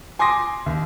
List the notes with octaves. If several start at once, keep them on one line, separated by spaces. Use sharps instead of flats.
G#5 C6 D6 D#6 A#6
D#2